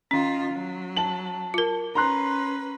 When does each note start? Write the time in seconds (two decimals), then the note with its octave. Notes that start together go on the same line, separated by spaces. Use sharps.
0.11 D#3 C#4 F4
0.53 F#3
0.97 A5 F#7
1.54 F4 A#4
1.95 C#4 B4 A#5 C6 F#6